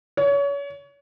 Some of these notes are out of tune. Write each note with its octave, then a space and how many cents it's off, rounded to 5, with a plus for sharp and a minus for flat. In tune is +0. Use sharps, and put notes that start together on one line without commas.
C#5 +30